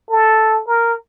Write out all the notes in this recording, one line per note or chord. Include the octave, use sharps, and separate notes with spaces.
A4
A#4